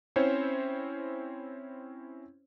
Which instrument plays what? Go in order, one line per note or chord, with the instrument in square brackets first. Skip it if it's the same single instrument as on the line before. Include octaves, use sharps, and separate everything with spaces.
[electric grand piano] C4 C#4 E4 C5 C#5